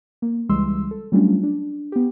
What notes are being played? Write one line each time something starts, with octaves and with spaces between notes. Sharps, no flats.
A#3
C#2 E3 G3 G#3 C6 E6
A4
F#3 G3 A3 C#4 D4 F4
D4
B3 G4